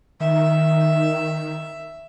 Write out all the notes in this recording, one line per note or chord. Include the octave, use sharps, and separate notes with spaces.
D#3 E5